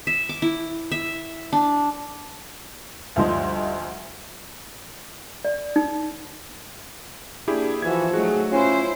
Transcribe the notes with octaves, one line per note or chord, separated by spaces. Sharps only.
E5
D6
E4
E5
D4
D2 G2 F3 D#4 C5 D#5
D5
D#4
A#3 D4 E4 G4 G#4
E3 F3 F#4 E5 G#6
F#3 A3 D#4 F#4 G#4
C#4 E4 F4 C5